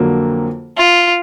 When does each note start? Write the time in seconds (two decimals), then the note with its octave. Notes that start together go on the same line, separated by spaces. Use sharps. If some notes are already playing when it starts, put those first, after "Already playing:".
Already playing: F2 D3 F#3 A#3
0.78 F4